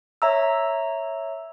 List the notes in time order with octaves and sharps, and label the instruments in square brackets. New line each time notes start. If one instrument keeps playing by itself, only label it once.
[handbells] C#5 E5 A#5 E6